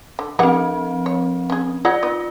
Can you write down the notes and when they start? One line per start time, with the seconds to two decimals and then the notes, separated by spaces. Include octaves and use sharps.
0.19 D3
0.39 F3 C4 G4 G#4 F#5
1.06 C#5
1.50 C#4 G#4
1.85 F4 G#4 C#5 F#5
2.03 B3 D#4